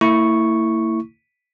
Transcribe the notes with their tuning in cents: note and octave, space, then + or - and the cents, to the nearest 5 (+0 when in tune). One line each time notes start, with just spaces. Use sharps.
A#3 -45 E4 -10 C#6 +0